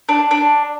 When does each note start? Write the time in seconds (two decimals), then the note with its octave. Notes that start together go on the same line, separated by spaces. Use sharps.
0.09 D4
0.31 D4